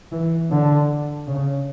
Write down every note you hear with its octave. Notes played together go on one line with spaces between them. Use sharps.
E3
D3
C#3